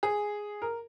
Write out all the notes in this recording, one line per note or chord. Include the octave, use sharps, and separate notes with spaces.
G#4
A#4